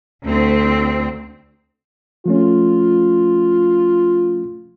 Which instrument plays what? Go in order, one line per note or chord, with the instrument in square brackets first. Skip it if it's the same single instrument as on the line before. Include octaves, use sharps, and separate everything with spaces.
[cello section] D2 C4
[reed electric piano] F3 A3 C#4 [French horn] F4